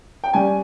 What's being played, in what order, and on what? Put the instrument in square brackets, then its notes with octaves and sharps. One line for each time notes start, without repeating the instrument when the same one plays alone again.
[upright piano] G5
G2 G3 C#4 G#5